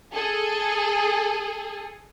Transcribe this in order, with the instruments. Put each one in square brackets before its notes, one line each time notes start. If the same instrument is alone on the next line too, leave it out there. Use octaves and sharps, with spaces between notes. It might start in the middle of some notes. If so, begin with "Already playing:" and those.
[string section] G#4 A4